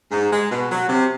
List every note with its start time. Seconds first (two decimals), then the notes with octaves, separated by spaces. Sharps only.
0.11 G#2
0.32 G#3
0.51 B2
0.71 F#3
0.88 C3